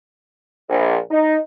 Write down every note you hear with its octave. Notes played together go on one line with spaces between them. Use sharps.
A#1
D#4